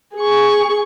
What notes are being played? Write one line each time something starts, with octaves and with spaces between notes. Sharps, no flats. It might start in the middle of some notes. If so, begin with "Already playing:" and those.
G#4 C#6